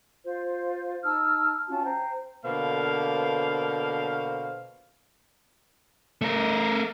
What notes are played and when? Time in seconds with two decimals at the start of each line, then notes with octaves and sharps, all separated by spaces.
0.24 F4 C5
1.04 D#4 A5 E6 F6
1.69 C#4 F4 F#4 A5
1.84 C5 G5 A#5
2.45 B2 D3 A#3 C5 F5
6.22 A3 A#4